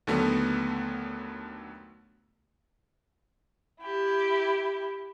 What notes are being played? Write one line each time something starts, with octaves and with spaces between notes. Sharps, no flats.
D#2 D3 F#3 A3 B3
E4 G4